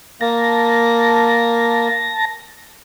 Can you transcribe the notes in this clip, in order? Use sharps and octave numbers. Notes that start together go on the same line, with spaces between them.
A#3 A5 A#6